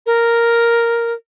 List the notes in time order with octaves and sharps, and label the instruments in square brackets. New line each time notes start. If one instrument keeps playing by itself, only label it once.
[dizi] A#4